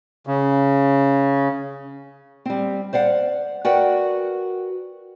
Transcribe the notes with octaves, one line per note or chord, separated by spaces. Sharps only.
C#3
G3 C4
C5 D5 F5 F#5
F#4 A#4 B4 D5 F#5 G5